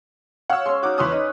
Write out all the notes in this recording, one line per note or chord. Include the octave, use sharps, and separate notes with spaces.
C#5 F5 F#5 C#6 E6
G#3 C#4 C6
D#4 F#4 F#5 D6
E2 C#4 B4 B5 C6 D#6
D#4